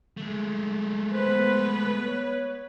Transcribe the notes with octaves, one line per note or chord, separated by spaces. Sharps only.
G#3 A3
B3 B4 C5
C#5